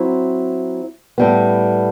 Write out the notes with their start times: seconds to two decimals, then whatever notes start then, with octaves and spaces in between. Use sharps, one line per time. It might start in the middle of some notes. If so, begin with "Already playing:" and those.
Already playing: F#3 C4 E4
1.18 A2 G3 B3